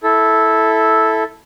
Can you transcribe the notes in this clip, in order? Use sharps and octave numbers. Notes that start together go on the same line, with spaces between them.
E4 A4